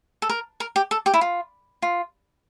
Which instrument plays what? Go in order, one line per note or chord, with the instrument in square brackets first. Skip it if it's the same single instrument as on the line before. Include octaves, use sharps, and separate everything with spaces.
[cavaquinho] A4
A#4
A#4
G4
A4
G4
E4
F4
F4